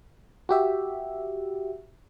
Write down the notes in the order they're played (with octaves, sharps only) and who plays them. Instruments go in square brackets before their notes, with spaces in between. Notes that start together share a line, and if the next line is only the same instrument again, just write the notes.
[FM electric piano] F#4 G4 E5